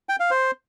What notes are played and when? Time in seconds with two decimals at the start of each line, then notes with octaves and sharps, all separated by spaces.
0.09 G5
0.20 F5
0.31 C5